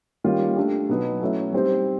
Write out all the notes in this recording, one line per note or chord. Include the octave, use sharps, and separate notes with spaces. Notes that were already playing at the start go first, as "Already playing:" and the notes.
D#3 G3 A#3 C#4 F4
A3 D4 G4
B2 F#3 B3 D#4
F#3 A3 C#4 E4
G3 C4 D#4 G4 C5